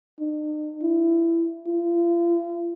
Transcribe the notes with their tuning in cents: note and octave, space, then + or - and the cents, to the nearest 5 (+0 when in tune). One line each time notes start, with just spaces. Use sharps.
D#4 -45
E4 +20
F4 -40